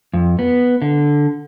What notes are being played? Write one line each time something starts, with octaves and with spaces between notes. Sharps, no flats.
F2
B3
D3